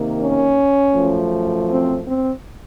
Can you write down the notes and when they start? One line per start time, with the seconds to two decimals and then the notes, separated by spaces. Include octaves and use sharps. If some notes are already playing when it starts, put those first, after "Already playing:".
Already playing: C3 D#3 A#3
0.19 C#4
0.93 F#2 F3 A3
1.68 C4
2.04 C4